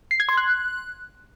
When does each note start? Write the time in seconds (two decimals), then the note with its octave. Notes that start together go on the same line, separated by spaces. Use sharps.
0.11 C7
0.20 G#6
0.29 C6
0.37 F#6